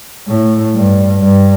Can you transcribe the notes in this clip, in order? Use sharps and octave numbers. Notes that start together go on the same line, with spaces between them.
A2
G2
G2